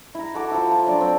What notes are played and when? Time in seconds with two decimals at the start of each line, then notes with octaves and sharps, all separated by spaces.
0.15 E4 A#5
0.34 F#4 A4 F#5 D6
0.51 F3 E4
0.72 F4
0.86 F#3 D4 D5
1.01 C4